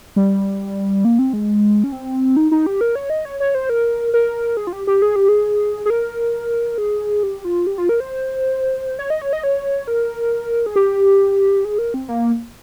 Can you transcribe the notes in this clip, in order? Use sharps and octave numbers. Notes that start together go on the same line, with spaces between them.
G3
A#3
C4
G#3
C#4
C4
D#4
D#4
G4
A#4
C#5
D#5
C#5
C#5
C5
A#4
A#4
G#4
F4
G4
G4
G#4
G4
G#4
G#4
A#4
G#4
G4
F4
G4
F4
A#4
C5
C#5
D#5
C#5
D#5
C#5
A#4
G#4
G4
G#4
A#4
C4
A#3